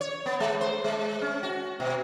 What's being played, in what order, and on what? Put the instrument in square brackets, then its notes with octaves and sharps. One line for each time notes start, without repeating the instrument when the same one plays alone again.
[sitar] C#5
B3
G#3
C5
G#3
C#4
F#4
B2